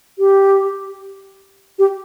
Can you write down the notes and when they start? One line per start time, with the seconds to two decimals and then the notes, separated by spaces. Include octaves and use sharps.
0.19 G4
1.79 G4